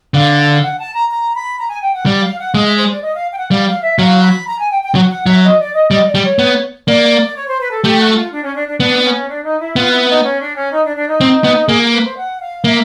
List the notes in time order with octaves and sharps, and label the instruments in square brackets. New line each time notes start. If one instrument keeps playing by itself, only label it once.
[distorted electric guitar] D3 [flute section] F5
[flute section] F#5
A5
A#5
A#5
B5
A#5
G#5
G5
F#5
[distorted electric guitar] G3
[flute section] F5
F#5
[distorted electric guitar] G#3 [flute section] F5
[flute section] E5
C5
D5
D#5
F5
G5
F#5
[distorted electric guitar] G3 [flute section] F5
[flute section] F5
E5
[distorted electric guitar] F#3 [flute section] F5
[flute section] B5
A#5
G#5
G5
G5
[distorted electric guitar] F#3 [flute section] F#5
[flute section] F#5
[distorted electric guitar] F#3 [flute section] E5
[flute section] D#5
D5
D#5
[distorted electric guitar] G3 [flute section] D#5
[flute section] D5
[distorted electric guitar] G3
[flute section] C#5
[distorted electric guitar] B3
[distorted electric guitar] A#3 [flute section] D5
[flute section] C#5
C5
B4
A4
[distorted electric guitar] A3 [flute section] G4
[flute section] F#4
F4
D4
C#4
D4
D4
[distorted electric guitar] B3 [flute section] D4
[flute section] C#4
D4
D#4
E4
[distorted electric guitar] B3 [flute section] F4
[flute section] E4
D#4
C#4
D4
C#4
D#4
D4
D4
D#4
[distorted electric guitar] C4
B3
[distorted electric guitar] A#3 [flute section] G#4
[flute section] A#4
B4
C5
F#5
F5
[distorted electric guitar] A#3 [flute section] E5